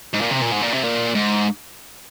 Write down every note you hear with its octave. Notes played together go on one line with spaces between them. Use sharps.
G#2
A#2
C3
A#2
G#2
A#2
C3
A#2
G#2